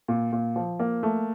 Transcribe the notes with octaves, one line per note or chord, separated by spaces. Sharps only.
A#2
A#2
F3
A#3
A3